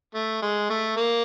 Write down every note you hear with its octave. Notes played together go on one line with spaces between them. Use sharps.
A3
G#3
A3
A#3